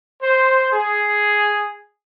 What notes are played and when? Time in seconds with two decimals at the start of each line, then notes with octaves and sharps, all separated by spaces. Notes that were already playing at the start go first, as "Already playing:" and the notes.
0.21 C5
0.72 G#4